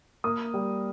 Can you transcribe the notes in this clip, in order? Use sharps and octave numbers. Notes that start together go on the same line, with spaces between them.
A#3 D#6
G3